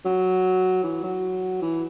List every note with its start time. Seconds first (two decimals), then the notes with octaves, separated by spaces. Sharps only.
0.05 F#3
0.83 E3
1.04 F#3
1.62 E3